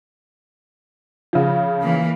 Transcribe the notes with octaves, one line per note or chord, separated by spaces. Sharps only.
C#3 F3
E3 A#3